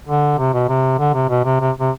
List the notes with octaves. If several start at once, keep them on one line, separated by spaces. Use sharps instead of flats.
D3
C3
B2
C3
D3
C3
B2
C3
C3
C3